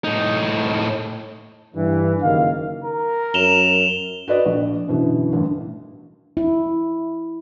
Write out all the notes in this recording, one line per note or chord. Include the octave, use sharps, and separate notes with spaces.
A2 D#4
G2 E3
F#1 D#3 F5
A#4
F#2 E7 F7 G7
F#4 B4 D5 D#5
A#1
F#2 B2 D3 E3
A1 G2
E4